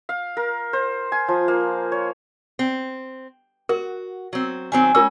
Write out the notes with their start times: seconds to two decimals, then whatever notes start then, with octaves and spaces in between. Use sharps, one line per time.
0.09 F5
0.37 A#4
0.73 C5
1.12 G#5
1.28 F3
1.48 A#3
1.92 C#5
2.59 C4
3.69 F#4 A#4
4.33 F#3 C4
4.72 D#3 F#3 C4 G#5
4.95 C#4 F4 A#4 E6